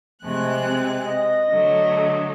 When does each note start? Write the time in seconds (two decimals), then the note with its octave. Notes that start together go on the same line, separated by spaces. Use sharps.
0.22 C3 F3 G#3 A3 F#6
0.67 C4
1.05 D#5
1.50 D3 F#3 A3